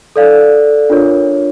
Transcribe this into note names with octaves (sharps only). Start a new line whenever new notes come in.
A4 D5 F5
D4 F4 A#4 C#5